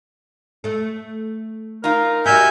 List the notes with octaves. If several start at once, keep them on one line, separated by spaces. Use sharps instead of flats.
A3 A4
D#4 F4 A#4
G3 F#4 E5 G#5 G6